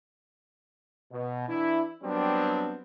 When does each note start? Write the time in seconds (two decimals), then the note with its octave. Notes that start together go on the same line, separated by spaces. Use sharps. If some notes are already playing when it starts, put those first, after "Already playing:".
1.12 B2
1.49 E3 D4 E4
2.03 F#3 G3 B3 C4 D4